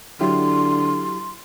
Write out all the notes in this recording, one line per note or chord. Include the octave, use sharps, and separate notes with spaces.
D3 F#3 E4 G4 C6